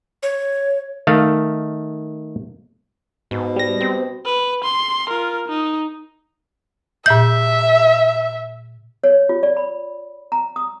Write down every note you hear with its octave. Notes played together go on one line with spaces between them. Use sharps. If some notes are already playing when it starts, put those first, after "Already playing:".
C#5
D#3 A3 F5
G#2 B2
G3 A#6
C4
B4
C6
F4 A#4
D#4
A#2 E5 G6
C#5
F4
D5
B5
A#5
D#6